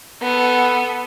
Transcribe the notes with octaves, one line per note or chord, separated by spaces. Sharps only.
B3 A4